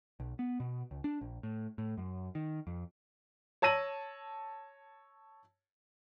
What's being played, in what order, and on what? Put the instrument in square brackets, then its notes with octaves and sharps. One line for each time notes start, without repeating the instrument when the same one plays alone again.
[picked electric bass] B1
B3
B2
C#2
D4
A#1
A2
A2
F#2
D#3
F2
[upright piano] C#5 A5 E6 A#6 D#7 F#7